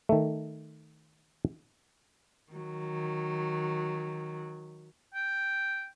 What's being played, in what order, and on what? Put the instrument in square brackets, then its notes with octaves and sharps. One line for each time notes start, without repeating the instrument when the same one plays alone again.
[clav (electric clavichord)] D#3 A3
[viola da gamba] D#3 F#3
[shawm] G5